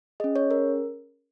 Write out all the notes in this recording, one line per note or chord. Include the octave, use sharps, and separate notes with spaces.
C#4 G#4 D#5
C#5
A#4